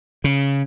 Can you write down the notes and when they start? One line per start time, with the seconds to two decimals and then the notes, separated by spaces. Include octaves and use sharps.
0.24 C#3